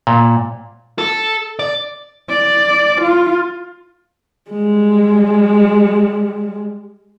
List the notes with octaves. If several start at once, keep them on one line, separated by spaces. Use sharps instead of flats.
A#2
A4
D5
D5
F4
G3 G#3